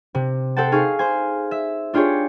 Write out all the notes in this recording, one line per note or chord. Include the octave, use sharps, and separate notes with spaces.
C3
A4 C5 F#5 G5 A5
D#4 G#4 F5 C#6
C5 G#5
E5
D4 F4 G4 G#4 C#5